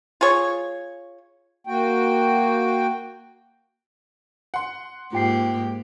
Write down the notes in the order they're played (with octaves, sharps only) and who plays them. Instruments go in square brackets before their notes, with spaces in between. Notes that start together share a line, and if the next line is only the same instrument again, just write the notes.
[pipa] F4 G#4 C#5
[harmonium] A#3 F#4 G5
[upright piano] F#5 C6
[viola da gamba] G#2 A#3 G4 [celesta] F4 G5 C7